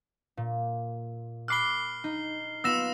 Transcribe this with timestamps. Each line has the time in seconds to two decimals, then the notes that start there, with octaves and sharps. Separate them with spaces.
0.37 A#2
1.48 B5 D6 F6 F#6 C7 G7
2.04 D#4
2.64 B3 F4 E6 A#6 E7